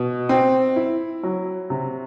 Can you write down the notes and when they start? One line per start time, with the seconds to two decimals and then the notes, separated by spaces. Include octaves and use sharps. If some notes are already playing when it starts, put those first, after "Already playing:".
Already playing: B2
0.29 C4
0.76 E4
1.23 F#3
1.70 C3